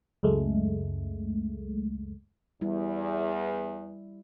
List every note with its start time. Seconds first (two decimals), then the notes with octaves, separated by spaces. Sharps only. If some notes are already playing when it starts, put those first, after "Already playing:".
0.23 C#2 F#2 G#3 A3
2.61 E2 G3 E4